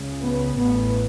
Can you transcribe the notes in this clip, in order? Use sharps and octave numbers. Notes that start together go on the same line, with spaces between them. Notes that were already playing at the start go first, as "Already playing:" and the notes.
Already playing: C#2 C#3
B3
A1 A2 B3